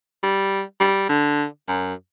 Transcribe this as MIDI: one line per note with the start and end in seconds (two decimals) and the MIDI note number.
0.23 0.62 55
0.81 1.08 55
1.09 1.45 50
1.68 1.94 42